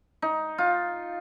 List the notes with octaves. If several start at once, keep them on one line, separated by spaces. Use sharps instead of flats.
D#4
F4